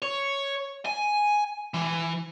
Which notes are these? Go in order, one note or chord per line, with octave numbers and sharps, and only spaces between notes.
C#5
G#5
E3